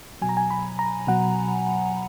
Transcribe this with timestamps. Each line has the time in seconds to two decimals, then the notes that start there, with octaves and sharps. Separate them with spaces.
0.22 B2 F#3 G#5
0.29 A#5
0.37 G#5
0.50 B5
0.79 A#5
1.07 B2 F#3 F#5